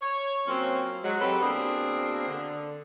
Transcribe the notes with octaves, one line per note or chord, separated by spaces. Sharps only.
C#5
F#3 A#3 C4 C#4 F4
F#3 G#3
C4 F#4 G4 A4 B4
B2 A#3 C4 D4 G#4
D3